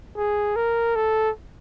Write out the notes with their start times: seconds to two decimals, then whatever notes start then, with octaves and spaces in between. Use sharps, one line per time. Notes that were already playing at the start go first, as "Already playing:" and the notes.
0.17 G#4
0.56 A#4
0.96 A4